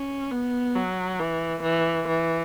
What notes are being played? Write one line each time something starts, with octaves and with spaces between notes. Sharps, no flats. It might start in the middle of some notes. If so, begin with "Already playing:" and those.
Already playing: C#4
B3
F#3
E3
E3
E3